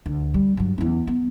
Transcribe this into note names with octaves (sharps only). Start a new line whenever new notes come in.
D2
G3
G2 F#3
E2 C#4
B3